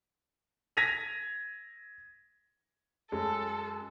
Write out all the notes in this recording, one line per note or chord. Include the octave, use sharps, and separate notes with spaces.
G#6 A#6 B6 D#7 F7
F#2 G#3 A4